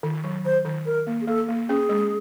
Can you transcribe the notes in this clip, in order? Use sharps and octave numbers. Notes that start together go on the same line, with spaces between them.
D#3
F#3
D#3 C5
D#3
D#3 A#4
A#3
G#4
A#3 A4
A#3
C#4 G#4
G#3